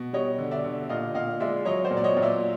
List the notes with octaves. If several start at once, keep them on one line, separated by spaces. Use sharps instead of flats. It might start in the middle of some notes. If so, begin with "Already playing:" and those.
Already playing: B2
G3 C#5 D#5
D3
D5 E5
D3
A#2 D#5 F5
A#2 D#5 F5
G#3 D5 E5
F#3 C#5 D#5
C5 D5
A#2
D5
C#5 D#5
A#2
D5 E5